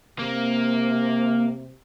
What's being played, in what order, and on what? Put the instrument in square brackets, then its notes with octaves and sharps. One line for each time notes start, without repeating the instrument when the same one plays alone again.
[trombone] C3 [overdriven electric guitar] A#3